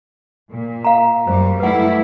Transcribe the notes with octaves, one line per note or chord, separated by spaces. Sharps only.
A#2
F5 A#5
F#2 G3 C5
G3 A3 E4 B4 F#5